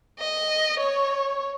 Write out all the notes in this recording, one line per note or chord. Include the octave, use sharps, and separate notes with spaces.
D#5
C#5